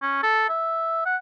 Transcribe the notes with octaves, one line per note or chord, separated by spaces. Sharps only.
C#4
A4
E5
F#5